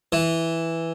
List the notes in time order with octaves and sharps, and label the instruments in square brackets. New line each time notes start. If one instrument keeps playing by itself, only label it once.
[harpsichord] E3